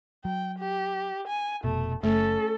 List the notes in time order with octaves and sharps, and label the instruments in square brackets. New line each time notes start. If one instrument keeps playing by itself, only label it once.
[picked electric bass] F#3 [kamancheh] G5
[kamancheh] G4
G#5
[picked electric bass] F1 B2 [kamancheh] A3
[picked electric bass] F#1 [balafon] A3 [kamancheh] C#4 [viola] A4